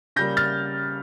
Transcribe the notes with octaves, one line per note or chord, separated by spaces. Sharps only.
C#3 G3 A#3 G6 A#6
F6 A6